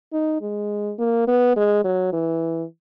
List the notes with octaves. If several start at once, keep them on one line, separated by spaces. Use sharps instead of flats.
D#4
G#3
A#3
B3
G#3
F#3
E3